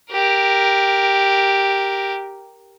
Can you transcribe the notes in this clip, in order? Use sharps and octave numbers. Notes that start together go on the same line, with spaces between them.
G4 A#4